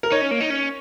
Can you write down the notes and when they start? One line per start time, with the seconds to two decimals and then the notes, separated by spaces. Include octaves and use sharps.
0.03 A#4
0.12 D#4 C#5
0.21 C#4
0.31 A#3
0.40 D#4
0.50 C#4